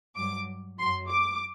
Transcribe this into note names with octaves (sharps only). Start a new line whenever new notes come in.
G2 F#3 D6
F#2 F#3 C6
D6